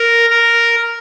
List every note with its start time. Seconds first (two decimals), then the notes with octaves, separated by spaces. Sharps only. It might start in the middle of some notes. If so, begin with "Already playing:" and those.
Already playing: A#4
0.31 A#4